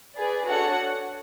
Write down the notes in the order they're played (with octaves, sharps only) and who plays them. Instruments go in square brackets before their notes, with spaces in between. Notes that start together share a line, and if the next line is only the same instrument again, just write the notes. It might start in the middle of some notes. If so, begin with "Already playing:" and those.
[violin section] G#4 B4 D5
D4 F#4 A4 C#5 F#5